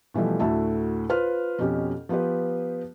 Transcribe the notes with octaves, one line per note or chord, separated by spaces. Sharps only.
B2 E3 F3 G3 A3
D2 A2 F#4 E5 A5
F4 B4 C5 F6
F2 B2 C#4 G4
F3 B3 F4 G4 B4